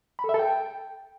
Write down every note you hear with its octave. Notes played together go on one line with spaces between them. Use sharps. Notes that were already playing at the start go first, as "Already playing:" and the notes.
B5
A4
E5
A4
G5